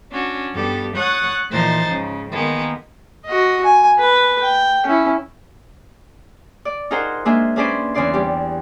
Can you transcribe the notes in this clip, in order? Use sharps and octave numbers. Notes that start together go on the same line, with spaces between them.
C#4 D4 F#4
G2 G3 B3 G4 A4
C#5 F#5 C#6 D#6 F#6 A6
A#2 E3 F3 D#4 C5 A6
G#2 C#3
D#3 G#3 A#3 B3
F#4 D#5
G#5
B4
G5
C#4 E4
D5
D#4 F4 G#4 A#4 C5 F#5
G#3 A#3 D4 F4 G#4 E5
C#4 D4 G#4 B4 C5 D5
E2 C#3 D5 C6
G3 G4